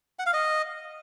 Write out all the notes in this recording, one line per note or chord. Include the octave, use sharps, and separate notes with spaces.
F#5
F5
D#5